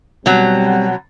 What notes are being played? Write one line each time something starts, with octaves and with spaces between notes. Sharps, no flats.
B2 F#3 G3 C4